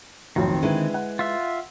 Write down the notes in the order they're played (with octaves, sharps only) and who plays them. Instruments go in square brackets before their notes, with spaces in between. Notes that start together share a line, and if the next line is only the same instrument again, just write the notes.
[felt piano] B1 F2 A2 [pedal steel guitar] D#3 C4
[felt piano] D3 [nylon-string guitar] G#3 E4 B4
[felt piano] F#5
[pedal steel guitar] F4 E5